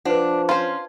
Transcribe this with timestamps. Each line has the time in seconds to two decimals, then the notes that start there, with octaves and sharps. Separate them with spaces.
0.05 F3 D4 B4 F#5
0.49 C#4 F4 C5